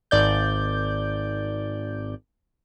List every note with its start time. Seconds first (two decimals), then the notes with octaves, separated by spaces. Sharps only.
0.11 G#1 D5 G6